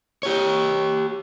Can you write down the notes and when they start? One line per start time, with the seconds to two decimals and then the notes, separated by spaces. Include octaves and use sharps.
0.23 G4 C#5